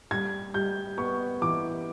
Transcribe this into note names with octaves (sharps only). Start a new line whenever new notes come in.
G3 G#6
G3 G6
B3 C#6
E3 D6